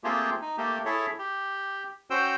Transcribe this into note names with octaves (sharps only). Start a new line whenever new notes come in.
A3 A#3 C4 F4 G4 G#4
D#4
A3 A#3 G4
E4 G#4 A4 C#5 E5
G4
C#4 F#4 C5 G5 E6